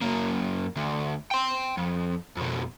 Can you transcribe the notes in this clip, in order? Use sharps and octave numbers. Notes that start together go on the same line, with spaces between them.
F#2 A#3
D2
G5 C6
F2
F2 B2